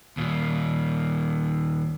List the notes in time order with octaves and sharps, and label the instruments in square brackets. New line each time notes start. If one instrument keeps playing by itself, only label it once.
[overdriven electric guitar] D#2 A#2